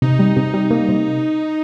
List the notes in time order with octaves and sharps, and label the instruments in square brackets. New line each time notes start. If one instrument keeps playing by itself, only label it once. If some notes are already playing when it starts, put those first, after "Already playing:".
[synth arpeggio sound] C3 [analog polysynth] D#4
[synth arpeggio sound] G3
C3
G3
A#3
C3